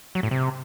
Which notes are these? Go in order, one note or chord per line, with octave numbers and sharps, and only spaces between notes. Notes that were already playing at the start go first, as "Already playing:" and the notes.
F#3
A2
C3